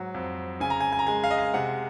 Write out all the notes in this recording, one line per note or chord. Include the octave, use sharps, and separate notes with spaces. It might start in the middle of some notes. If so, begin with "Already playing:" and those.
Already playing: G#2 F#3
F2
C#3 G#5
A#5
G#5
G#5
A#5
G#3 G#5
F5
D#5
F5
C3 F#5